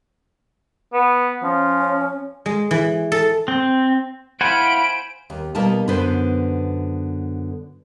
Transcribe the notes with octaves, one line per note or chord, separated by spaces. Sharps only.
B3
F3 C#4
G#3
E3
A4
C4
E4 C5 F5 F#5 G#5 B5 D7
D#2
B2 G3 A#3 D#4 A#4 A5
F#2 D3 B3 B4 C5